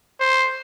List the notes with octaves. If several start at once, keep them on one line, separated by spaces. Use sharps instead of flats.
C5